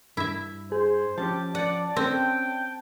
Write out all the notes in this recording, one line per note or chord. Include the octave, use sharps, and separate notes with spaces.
G2 E4 E5
G#4 C5
F3 C#4 G4 A5
D5 F#5
C4 C#4 A4 D5 G5